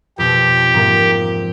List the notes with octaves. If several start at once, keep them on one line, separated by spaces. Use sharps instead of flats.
F2 B2 G4
G#2 F3 A#3